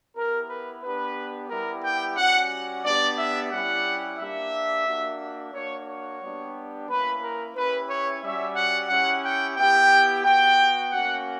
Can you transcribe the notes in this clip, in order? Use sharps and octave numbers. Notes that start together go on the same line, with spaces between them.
B3 E4 G4 A#4
B4
B3 D4 G4 B4
G3 B3 E4 G4 A#4
G5
G3 C#4 F#4 F#5
B3 D4 G4 D5
E5
G3 C#4 E4 G4 F#5
A#3 D4 G4 E5
A#3 D4 F#4
A#3 D4 F#4 C#5
C#5
G3 B3 D4 G4
A#3 C#4 E4 B4
A#4
C#4 E4 G4 B4
C#5
G3 C#4 F#4 E5
F#5
C#4 E4 G4 F#5
G5
B3 E4 G4 G5
B3 F#4 G5
A#3 C#4 F#4 F#5